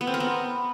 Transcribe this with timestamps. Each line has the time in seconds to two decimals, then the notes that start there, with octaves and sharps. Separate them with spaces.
0.01 B3
0.07 C4
0.14 A#4
0.20 B3